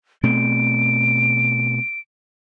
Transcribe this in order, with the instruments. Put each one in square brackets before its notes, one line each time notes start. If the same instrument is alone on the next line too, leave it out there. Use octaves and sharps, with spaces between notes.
[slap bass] B2 A3 C4 [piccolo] D7